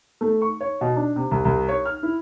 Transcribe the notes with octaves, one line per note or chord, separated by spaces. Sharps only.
A3
C#6
C#5
B2
D4
C3
C2
C2
C#5
F6
E4